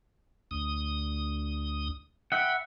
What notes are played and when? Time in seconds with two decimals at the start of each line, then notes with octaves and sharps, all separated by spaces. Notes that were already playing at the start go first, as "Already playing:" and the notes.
0.51 D2 D#6
2.32 E5 F#5 G5 B5